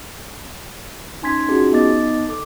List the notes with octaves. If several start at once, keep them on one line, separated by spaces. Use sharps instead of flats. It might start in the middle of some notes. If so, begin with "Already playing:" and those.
C#4 D#4 G#5 C6 G#6 B6
C#4 D#4 F4 F#4 G#4
B3 D#4 D#5 D6 A6
A4 D6